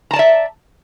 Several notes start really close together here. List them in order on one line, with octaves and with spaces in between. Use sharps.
A#5 A5 D5 E5